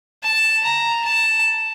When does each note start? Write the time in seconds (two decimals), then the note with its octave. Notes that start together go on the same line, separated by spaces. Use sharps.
0.23 A5
0.64 A#5
1.04 A5